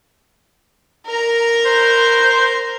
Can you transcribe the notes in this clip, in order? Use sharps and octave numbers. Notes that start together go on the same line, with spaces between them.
A#4 A#5
C5